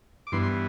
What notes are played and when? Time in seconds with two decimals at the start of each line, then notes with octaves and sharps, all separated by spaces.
0.27 D6
0.32 G2 E3 B3 C6
0.43 C6